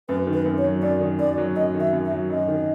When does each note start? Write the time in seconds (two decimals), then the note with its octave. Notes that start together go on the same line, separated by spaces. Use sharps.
0.09 F#2 B4
0.27 D#3
0.33 B4
0.46 F#2
0.58 C#5
0.64 F#3
0.82 F#2 D5
1.01 D#3
1.19 F#2 D5
1.38 F#3
1.56 F#2 D#5
1.74 D#3
1.80 E5
1.93 F#2
2.05 E5
2.11 F#3
2.30 F#2 D#5
2.48 D#3